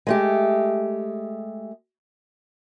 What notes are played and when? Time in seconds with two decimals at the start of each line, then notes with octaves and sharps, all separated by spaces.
0.07 G#3 A3 G4